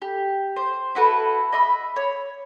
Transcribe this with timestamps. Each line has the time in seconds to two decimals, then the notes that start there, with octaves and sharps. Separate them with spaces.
0.02 G4
0.56 C5
0.95 E4 F#4 A4 B4
1.52 D#5 E5 B5
1.96 C#5